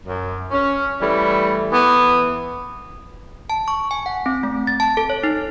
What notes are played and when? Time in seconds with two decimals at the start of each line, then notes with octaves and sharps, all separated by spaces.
0.07 F#2
0.51 C#4
1.01 E3 G3 A3
1.72 E3 B3
3.50 A5
3.68 C#6
3.91 G#5
4.06 F#5
4.26 C4
4.43 A3
4.67 A6
4.80 A5
4.97 A4
5.10 C#5
5.23 D#4